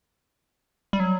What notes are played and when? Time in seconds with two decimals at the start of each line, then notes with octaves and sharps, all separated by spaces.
0.93 G3
1.00 F#3